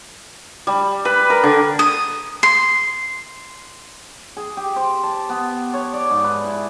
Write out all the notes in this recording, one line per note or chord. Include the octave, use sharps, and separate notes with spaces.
G3
B4
A#4
D3
D#6
C6
G#4
G4
C5
A5
B3
C#5
D5
G#2
B4
E4